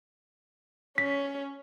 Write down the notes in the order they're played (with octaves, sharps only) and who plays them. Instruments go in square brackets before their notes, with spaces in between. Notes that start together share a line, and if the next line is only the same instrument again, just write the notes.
[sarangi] C#4 [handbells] B6